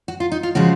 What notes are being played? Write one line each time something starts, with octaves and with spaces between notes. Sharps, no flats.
F#4
F4
D#4
F4
C#3 F3 G#3 F#4